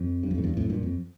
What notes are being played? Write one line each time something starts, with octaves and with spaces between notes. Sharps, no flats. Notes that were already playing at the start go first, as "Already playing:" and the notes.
Already playing: F2
G2
F2
A2
E2 G2
F2 A2
G2 A#2
F2